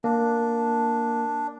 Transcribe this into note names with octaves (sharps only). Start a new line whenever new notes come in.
A#3 D4